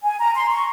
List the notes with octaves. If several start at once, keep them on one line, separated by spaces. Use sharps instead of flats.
G#5
A#5
C6
C#6